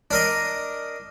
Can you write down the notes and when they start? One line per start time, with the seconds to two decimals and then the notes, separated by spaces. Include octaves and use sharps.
0.11 D4 A#4 D#5